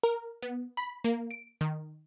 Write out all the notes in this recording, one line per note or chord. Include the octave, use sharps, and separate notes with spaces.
A#4
B3
B5
A#3
D7
D#3